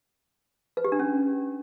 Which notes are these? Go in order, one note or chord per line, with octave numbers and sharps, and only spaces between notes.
B4
G4
D4
C#4